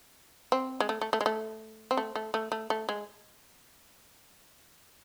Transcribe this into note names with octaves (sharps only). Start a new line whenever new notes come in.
C4
G#3
A3
A3
A3
G#3
A3
C4
A3
A3
A3
A3
A3
G#3